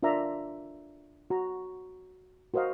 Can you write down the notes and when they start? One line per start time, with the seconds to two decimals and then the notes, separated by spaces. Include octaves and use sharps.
0.03 D4 F4 A#4 D5 E5 A#5
1.30 F#4 A#5
2.54 F#4 A#4 C5 D#5 F5